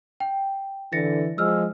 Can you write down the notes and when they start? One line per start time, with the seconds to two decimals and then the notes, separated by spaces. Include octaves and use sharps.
0.20 G5
0.93 D3 E3 A6 A#6 C#7
1.38 F3 G#3 E6 F6